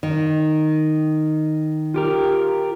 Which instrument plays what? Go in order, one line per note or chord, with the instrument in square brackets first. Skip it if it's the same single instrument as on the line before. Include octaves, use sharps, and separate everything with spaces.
[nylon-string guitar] D#3
[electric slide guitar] F4 G4 A#4